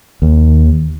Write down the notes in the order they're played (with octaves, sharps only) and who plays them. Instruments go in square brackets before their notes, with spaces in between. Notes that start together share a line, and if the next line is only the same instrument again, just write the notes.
[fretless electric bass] D#2